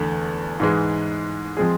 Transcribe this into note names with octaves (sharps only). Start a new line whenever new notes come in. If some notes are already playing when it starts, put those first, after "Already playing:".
Already playing: E2 D3 A3
G#2 E3 G#3
F3 G#3 C4 G#4